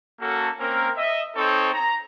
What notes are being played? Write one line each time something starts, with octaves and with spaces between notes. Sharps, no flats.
A#3 C#4 F#4 A4
A#3 C4 C#4 A#4
D#5 E5
C4 D#4 A4 C5 C#5
A#5